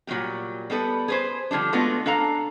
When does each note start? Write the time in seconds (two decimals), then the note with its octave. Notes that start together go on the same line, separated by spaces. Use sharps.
0.07 A#2 F#3 G3 A#3 G4
0.70 G3 B3 A4 B4
1.08 G#4 B4 C5
1.51 D3 F3 G3 D4
1.73 G#3 A3 B3 D4 F4 F#4
2.06 D4 A4 F5 A#5